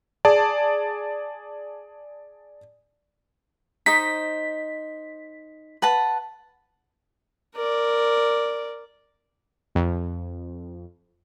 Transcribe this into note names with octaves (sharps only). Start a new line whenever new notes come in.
G#4 D5 A5
D#4 C5 D#5 B6
B4 F#5 A5
A#4 D5
F2